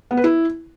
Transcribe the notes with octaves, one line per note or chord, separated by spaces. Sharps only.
B3
B4
E4